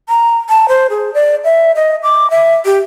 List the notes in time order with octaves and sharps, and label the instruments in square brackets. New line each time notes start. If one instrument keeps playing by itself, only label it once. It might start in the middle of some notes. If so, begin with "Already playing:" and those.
[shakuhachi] A#5
A5
C5
G#4
D5
E5
D#5
D6
E5
G4